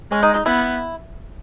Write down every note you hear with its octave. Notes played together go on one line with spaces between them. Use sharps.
G#3 C#4
D#4
D#4
B3 E4